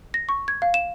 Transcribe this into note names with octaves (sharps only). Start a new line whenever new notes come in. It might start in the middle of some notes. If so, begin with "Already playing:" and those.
A#6
C#6
G#6
F5
E7